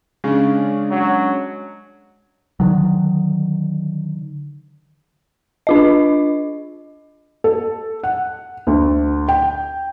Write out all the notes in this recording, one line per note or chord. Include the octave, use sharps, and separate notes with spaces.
C#3 G#3 C#4 D4
F#3
D3 D#3 F#3
D4 F4 D#5
A4
F#5
D2
G5